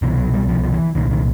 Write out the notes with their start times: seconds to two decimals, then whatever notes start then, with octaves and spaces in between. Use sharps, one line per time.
0.02 C2 B2 E3
0.18 F#3
0.33 G3
0.49 F3
0.64 F3
0.73 E3
0.95 C2 A#2 D#3
1.11 D#3